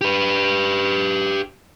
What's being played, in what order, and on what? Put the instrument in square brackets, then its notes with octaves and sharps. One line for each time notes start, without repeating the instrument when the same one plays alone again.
[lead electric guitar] G4 B4